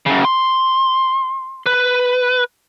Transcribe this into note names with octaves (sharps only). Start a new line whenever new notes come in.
F#2 C#3
C6
B4